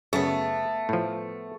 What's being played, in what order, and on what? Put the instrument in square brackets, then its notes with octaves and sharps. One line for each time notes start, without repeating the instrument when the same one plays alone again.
[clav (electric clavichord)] F#2 C#3 [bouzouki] A3 B3
[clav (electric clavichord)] A2 F3